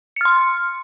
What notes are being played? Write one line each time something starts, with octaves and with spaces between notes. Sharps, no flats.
C6 F6 C#7